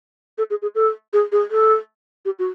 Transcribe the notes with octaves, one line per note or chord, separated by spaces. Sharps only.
A4
G#4
G#4
A4
G#4
G#4
A4
G4
F#4